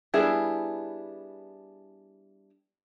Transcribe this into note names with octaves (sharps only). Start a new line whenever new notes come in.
G3 B3 D4 E4 G#4